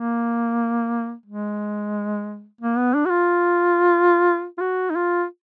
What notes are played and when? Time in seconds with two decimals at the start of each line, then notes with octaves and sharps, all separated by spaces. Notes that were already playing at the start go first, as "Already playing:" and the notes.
Already playing: A#3
1.26 G#3
2.61 A#3
2.78 B3
2.94 D4
3.05 F#4
3.10 F4
4.58 F4
4.61 F#4
4.90 D#4
4.96 F4